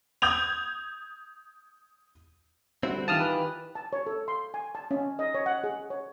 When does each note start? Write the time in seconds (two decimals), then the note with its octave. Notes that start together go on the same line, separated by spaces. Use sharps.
0.22 D#6 G6 G#6 F7
2.83 D3 G3 C4 E4 F#4
3.08 D#3 E3 F4 G4 A5 D#6 F6
3.20 B4
3.75 A5
3.93 C#5
4.06 A4
4.28 C6
4.54 G#5
4.75 A5
4.91 C#4
5.19 D#5
5.34 C#5
5.46 F#5
5.64 G#4
5.90 C#5